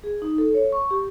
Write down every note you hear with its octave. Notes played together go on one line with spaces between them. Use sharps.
G#4
D#4
A4
C#5
C#6
G4